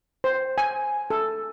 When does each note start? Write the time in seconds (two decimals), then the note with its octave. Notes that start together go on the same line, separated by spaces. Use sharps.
0.24 C5
0.58 G#5
1.10 A4